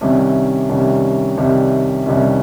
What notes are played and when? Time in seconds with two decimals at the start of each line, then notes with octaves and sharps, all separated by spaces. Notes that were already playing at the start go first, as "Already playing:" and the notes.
0.01 C2 C3 D#3 G3 C#4
0.69 C2 C3 D#3 G3 C#4
1.37 C2 C3 D#3 G3 C#4
2.06 C2 C3 D#3 G3 C#4